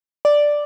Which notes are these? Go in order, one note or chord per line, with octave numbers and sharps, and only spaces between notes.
D5